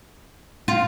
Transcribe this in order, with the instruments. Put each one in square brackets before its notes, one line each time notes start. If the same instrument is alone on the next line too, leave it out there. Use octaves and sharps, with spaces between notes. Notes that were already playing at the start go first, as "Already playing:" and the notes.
[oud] F4